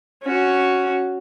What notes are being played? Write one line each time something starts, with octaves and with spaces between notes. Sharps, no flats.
C#4 F#4